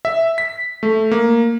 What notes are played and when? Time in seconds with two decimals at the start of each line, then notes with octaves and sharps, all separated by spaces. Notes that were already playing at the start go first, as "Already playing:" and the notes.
0.05 E5
0.38 B6
0.83 A3
1.11 A#3